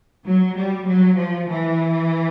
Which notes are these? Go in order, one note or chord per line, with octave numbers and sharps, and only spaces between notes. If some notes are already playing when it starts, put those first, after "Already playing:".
F#3
G3
F#3
F3
E3